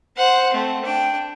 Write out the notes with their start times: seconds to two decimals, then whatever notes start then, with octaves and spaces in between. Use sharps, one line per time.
0.17 C5 F#5
0.54 A3 C4
0.85 D4 G5